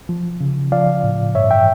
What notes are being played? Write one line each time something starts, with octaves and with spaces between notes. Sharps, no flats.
F3
C#3
F3 D5 F5
A2
G2 C#5 E5
E5 G5